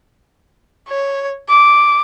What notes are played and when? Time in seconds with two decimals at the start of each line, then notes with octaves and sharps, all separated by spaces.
0.88 C#5
1.49 D6